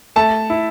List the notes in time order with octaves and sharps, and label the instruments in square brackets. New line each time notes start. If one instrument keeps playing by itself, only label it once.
[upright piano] A3 [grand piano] A5
[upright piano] E4